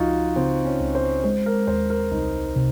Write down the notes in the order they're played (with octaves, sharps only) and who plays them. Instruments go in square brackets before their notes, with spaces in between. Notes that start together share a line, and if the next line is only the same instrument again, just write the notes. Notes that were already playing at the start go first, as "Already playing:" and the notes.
Already playing: [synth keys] C#2 F3 [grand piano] D#4 F4 F#4
[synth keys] C#3 [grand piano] C4
[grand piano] C#4
[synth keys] C#2
[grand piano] C5
[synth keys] G#3 [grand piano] C5
[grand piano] A#4
[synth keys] D#2 [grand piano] C5
[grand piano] A#4
[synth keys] C2 [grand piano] D#4
[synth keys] C3